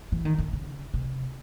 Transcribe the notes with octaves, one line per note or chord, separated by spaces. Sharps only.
E3
D#3
D3
C#3
C3